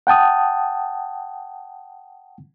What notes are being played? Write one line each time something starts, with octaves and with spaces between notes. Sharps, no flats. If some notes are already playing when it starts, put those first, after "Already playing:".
F#5 G5 A5 D#6